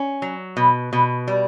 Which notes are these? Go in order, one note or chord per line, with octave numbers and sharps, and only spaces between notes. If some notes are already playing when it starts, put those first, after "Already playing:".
Already playing: C#4
F#3
B2
B2
G3